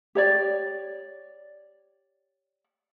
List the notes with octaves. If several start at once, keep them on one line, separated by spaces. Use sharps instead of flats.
G4 C#5 D5